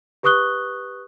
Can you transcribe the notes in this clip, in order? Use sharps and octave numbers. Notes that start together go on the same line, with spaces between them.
G4 B4 C#6 D#6 F#6 G7